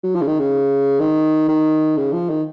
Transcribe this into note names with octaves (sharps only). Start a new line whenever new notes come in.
F#3
F3
C#3
D#3
C#3
D#3
D#3
C#3
F3
D#3